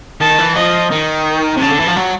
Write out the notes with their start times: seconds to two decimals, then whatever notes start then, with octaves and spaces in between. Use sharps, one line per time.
0.20 D#3 A5
0.38 E3
0.56 F3 D#5
0.91 D#3
1.56 C3
1.61 C#3 A5
1.69 D3
1.79 E3
1.87 F3
1.96 F#3